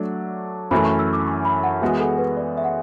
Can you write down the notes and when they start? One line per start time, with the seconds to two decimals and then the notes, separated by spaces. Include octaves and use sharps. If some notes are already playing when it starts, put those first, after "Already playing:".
Already playing: F#3 A3 D4
0.71 F#2 E3 A3 B5
0.85 C#6
0.99 E6
1.13 D6
1.27 C#6
1.45 B5
1.63 F#5
1.82 E3 G#3 B3 F#4 G#4
2.00 A4
2.18 B4
2.37 D5
2.58 E5
2.64 F#5